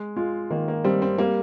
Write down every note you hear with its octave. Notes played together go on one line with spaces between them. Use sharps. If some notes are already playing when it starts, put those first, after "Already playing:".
Already playing: G#3
G#3 F4
D#3 A#3
A#3
G3 C4
C4
G3 A#3